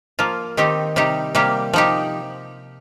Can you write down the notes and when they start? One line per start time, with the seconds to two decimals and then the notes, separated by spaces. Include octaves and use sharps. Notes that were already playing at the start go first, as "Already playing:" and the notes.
0.19 F3 A#3 F4
0.57 D#3 C4 D#4 G4
0.96 C3 G3 D#4 G4
1.35 C3 G3 A#3 G4
1.73 F3 D#4 G4